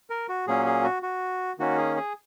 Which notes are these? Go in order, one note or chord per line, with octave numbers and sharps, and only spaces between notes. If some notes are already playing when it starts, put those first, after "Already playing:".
A#4
F#4
A#2 F#3 A#3 C#4 G#4
G#4
F#4
F#4
D#3 A#3 C#4 F#4
G#4
G#4